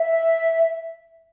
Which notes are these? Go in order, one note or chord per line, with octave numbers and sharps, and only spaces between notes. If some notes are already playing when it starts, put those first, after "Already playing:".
Already playing: E5